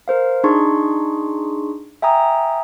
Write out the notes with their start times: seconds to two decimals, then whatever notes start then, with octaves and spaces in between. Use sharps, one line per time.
0.08 A#4 C5 F5
0.44 D4 D#4 G#4 C6 C#6
2.02 E5 G5 G#5 A#5 D#6